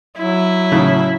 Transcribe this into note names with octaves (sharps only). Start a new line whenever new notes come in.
F#3 E4
A2 C#3